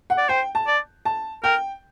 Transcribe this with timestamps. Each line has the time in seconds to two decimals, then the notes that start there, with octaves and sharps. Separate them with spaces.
0.10 F#5
0.18 D5
0.29 C5 G5
0.55 A5
0.67 D5
1.05 A5
1.44 A#4 G5